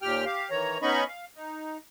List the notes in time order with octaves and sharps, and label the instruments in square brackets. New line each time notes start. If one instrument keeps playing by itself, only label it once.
[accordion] D#2 A#2 G4 G5 F6
G4 F5
D#3 E3 C#5 A#5
B3 C#4 D#4 D#5 B5 C#6
F5
D#4